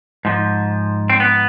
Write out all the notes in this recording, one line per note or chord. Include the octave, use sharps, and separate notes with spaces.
G#2 F3
C4
B3